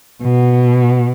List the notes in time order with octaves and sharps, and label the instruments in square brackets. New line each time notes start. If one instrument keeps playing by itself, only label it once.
[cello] B2